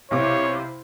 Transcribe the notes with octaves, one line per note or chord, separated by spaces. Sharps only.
B1 C3 E4 C5 C#5 D6